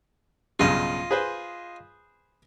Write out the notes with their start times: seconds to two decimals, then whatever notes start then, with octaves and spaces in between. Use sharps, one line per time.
0.59 B1 G2 C#3 F4 D#5
1.11 G#4 B4 C5